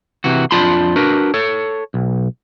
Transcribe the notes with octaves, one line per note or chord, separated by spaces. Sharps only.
C3 E3 F#4
F2 D4 F4 A5 B5 C6
D4 F#4 A#4 B4
A4 C#5
B1